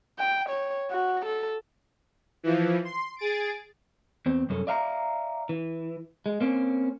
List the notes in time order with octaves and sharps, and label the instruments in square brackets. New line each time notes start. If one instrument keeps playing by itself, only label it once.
[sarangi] G5
C#5
F#4
A4
[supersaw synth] E3 F3
C6
G#4 A6 D7
[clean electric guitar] E2 C4
C2 F#2 C#4 A4
D5 E5 F5 A5 A#5
E3
G#3
A#3 C4 C#4